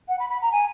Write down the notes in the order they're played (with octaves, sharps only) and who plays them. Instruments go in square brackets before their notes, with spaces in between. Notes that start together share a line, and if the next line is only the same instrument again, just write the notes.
[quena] F#5
B5
B5
A#5
G#5